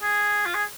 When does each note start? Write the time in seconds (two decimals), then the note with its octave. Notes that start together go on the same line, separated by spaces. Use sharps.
0.02 G#4
0.46 F4
0.54 G#4